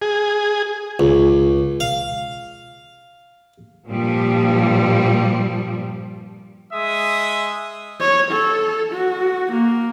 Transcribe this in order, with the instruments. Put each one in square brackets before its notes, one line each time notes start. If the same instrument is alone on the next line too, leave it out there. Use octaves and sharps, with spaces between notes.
[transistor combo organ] G#4
[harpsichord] C#2
F5
[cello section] G2 A#2 F3 G3
[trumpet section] G#3 E5 D#6
[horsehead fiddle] C#5
A4
F#4
A#3